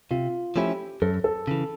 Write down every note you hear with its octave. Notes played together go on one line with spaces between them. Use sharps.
C3 F4
F3 A3 C#4 E4 G4
F#2 A4
A4
C#3 E3